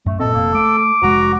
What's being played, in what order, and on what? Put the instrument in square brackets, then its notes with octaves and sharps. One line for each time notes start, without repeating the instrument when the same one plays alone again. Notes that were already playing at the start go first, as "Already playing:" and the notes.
[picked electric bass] F#2 [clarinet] A3
[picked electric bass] F#2 A#2 C4 [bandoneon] A4 [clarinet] D#5
[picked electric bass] F1 [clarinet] A#3
[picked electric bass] A3 [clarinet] D6
[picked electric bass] F1 G#3 [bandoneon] F#4 A#5